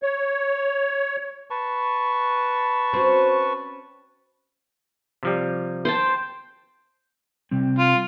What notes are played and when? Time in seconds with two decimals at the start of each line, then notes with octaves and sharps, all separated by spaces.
0.03 C#5
1.50 B4 A5 C#6
2.93 C4 C#4 F#4
5.23 C3 F3 G3
5.85 C5 G5 A5
7.51 C3 G3 C4
7.79 F4